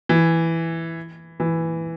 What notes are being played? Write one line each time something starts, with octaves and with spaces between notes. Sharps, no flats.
E3
E3